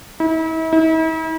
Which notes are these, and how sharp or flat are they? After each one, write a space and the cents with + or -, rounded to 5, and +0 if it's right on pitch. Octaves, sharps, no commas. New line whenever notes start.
E4 -40
E4 -45